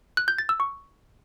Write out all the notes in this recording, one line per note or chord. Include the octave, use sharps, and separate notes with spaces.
F#6
G6
A6
E6
C#6